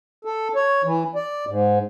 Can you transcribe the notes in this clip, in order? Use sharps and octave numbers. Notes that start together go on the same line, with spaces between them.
A4
C#5
E3
D5
G#2